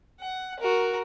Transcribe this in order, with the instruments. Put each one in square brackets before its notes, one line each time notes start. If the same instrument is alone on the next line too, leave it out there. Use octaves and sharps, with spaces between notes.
[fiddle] F#5
F#4 A#4